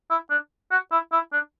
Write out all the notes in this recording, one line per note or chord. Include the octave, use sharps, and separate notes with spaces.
E4
D4
F#4
E4
E4
D4